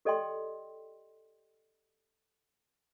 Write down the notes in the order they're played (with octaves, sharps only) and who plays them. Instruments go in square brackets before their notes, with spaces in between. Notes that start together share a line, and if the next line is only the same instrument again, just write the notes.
[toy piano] G4 A4 D5 D#5 G5 C6